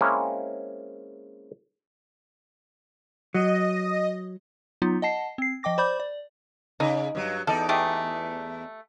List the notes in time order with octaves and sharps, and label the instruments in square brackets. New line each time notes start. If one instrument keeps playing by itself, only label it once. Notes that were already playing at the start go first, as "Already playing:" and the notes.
[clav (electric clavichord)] G#3 A#3 C4 C#4 E4
[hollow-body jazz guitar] F#3 [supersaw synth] D#5
[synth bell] F#3 B3 D#4 F4
D#5 F#5 A5 C7
C4 C7
F3 D#5 G5 D6 A#6
C5 D5 B5 D6 G6
D5
[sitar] C#3 [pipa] D#4
[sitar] G2 F#3
[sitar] E2 D#4 D5 [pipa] A4
[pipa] A3 G4 G#4